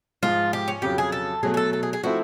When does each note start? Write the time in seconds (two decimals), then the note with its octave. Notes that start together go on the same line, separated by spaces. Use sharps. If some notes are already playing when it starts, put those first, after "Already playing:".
0.23 G#2 F3 G#3 F4
0.53 G4
0.68 C#4
0.82 F2 C#3 F#3 G4
0.98 G#4
1.12 A4
1.43 B2 F#3 A3 G#4
1.54 G#4
1.57 A4
1.73 A4
1.83 G#4
1.93 G#4
2.03 F3 A3 C4 E4 F#4